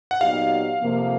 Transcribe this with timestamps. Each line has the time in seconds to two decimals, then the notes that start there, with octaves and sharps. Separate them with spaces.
0.11 F#5
0.21 A#2 F#3 B3 D#4 G4 F5
0.81 F2 C3 F3 A#3